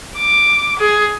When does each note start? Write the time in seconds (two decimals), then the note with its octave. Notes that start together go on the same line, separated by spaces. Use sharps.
0.17 D6
0.79 G#4